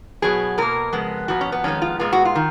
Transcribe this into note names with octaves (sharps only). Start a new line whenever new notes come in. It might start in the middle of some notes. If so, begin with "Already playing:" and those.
B2 F#3 B3 G#4
B2 A#3 A#4
F2 C#3 G#3 B3
A#2 F3 B3 F#4
C#4
B3
F2 D#3 G#3 B3 C#4
F4
A#2 G#3 B3 F4
F#4
F4
D#3